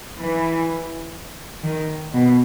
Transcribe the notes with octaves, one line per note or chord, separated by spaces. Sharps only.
E3
D#3
B2